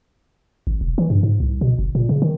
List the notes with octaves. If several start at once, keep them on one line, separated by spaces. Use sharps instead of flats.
G#1
E1
E3
G2
G#2
C2
B2
F#1
A#2
C#3
D#3